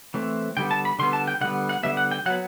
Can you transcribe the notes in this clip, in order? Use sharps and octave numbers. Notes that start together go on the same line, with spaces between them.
E3 A3 C4
D3 G3 B3 G5
A5
B5
D3 G3 B3 C6
A5
G5
D3 G3 B3 F#5
F#5
D3 G3 B3 E5
F#5
G5
F#3 B3 F#5